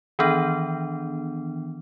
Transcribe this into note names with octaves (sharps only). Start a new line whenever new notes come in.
D#3 E3 B3 D4